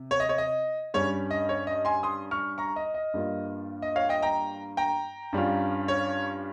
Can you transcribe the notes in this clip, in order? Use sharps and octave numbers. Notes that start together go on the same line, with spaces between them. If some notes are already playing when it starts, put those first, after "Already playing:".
Already playing: C3
C#5
D#5
C#5
D#5
G2 G3 C#4 C#5
D#5
C#5
D#5
G#5 C6
C6 D#6
C#6 F6
A#5 C#6
D#5
D#5
G2 G3 A#3 F4
D#5
C#5 F5
D#5 G5
G5 A#5
G5 A#5
G2 G3 C#4 F4
C#5